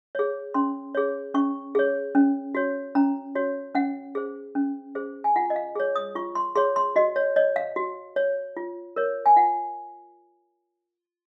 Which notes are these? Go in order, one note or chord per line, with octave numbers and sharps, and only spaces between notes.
G#4 C#5
C#4 C6
G#4 C#5
C#4 C#6
G#4 C#5
C#4
F#4 C#5
C#4 A#5
F#4 C#5
C#4 F#5
G#4 C5
C#4
G#4 C5
G#5
F4 F#5
D#5
F5
G#4 C#5
D#6
F4 C#6
C6
G#4 C#5 C6
C6
F#4 D#5
C#5
C#5 D#5
F5
F#4
C#5
F4
A#4 C#5
G#5
F4 F#5